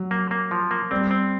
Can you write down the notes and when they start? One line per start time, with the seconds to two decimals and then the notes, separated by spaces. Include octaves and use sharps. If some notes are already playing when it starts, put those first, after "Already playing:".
Already playing: F#3
0.11 A#3
0.31 A#3
0.51 F3
0.71 A#3
0.91 G3 C4
1.11 C4